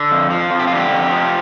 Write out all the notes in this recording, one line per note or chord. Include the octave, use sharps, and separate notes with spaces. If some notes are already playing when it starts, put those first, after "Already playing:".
Already playing: D3
F2
F3
F2
G4
F4
D3 G4
F2
F3